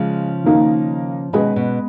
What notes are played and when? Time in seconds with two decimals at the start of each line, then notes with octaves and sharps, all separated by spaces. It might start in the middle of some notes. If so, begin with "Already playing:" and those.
Already playing: C#3 F3 G#3
0.44 D#3 A#3 D#4
1.33 B2 D#3 G#3 C#4 G#4 B4 D#5
1.56 B2